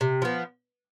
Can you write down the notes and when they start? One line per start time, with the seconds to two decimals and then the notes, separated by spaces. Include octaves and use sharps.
0.01 C3
0.22 F3 B3